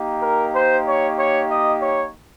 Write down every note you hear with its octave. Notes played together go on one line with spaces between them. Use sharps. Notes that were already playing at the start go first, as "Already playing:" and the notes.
Already playing: A#3 D#4 G4
A#4
C5
C#5
C#5
D#5
C#5